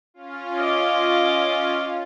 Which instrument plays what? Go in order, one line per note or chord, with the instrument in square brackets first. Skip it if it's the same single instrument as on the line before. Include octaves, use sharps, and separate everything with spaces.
[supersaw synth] C#4 F4
[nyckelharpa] D#5 D6